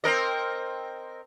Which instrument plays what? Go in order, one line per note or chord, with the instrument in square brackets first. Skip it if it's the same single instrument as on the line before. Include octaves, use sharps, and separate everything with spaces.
[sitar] C4 A#4 D#5